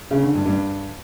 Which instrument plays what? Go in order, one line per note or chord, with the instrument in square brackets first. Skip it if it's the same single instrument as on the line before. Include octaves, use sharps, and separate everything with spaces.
[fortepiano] C#3
D3
G2
G2